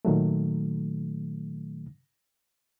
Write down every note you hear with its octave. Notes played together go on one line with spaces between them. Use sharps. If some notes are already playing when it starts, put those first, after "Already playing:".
A#2 D#3 F#3 A3